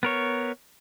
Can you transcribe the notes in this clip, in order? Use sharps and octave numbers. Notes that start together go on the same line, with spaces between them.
B3 A#4 C#5